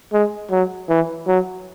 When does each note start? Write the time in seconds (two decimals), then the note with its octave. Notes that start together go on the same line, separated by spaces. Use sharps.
0.12 G#3
0.51 F#3
0.89 E3
1.27 F#3